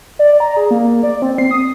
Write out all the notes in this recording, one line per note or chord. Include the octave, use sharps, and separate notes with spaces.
D5
A#5
G#4
A#3
D5
C4
C7
D#6